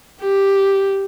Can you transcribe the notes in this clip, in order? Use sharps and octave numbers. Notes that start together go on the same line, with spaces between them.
G4